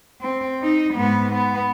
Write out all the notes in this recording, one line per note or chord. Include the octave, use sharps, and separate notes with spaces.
C4
D#4
G#2 B3
B3